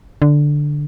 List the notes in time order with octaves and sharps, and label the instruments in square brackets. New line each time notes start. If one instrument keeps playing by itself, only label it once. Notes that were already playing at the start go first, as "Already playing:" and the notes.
[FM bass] D3